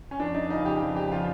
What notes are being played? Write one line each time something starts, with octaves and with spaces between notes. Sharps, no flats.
C#4
F2 D4
D#4
C#3 F3 D#4
G4
F2
G4
C#3 F3 F4